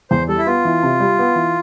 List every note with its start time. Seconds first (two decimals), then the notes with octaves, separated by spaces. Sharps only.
0.11 E2 C5
0.28 G3 A4
0.38 E4
0.46 B3 F4
0.65 E3
0.83 C3
1.00 G3
1.19 B3
1.36 E3